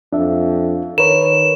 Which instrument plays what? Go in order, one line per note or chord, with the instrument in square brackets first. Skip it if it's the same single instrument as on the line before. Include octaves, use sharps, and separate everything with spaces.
[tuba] F2 [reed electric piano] D4 E5
[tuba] D#3 [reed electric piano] A#4 B4 C#5 [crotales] E7